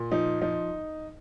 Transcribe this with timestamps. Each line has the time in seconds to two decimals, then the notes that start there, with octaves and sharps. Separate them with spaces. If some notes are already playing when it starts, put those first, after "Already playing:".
Already playing: A#2
0.12 F3 D#4
0.42 F3 D#4